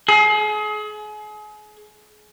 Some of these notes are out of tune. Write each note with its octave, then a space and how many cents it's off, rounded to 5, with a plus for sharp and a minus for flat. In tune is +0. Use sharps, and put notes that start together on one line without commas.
G#4 +35